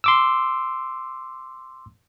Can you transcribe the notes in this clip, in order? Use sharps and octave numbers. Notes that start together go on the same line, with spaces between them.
C6 D6 E6